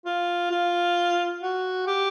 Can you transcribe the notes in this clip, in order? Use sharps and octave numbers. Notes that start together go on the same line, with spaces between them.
F4
F4
F#4
G4